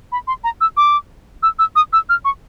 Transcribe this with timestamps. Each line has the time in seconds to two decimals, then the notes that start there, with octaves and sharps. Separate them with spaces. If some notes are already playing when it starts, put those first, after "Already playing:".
0.12 B5
0.27 C6
0.44 A#5
0.61 E6
0.77 D6
1.43 E6
1.59 E6
1.76 D#6
1.93 E6
2.09 F6
2.25 C#6